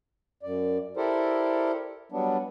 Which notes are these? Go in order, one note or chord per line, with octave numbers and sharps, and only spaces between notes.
F#2 D5
E4 G4 A4 A#4 C5 D5
F#3 G3 B3 D4